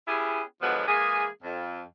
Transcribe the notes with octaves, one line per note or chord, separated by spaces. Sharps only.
B3 C#4 E4 G4 G#4
B2 D3 F3 F#3 G#3 B3
E3 G#3 A#3 G#4
F2